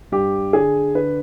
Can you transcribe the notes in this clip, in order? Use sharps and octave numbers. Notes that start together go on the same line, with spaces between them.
G2 G4
D3 G#4
D3 B4